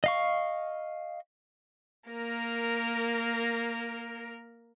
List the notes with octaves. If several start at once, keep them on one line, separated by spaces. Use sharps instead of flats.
D#5 F5 C#6
A#3 A#4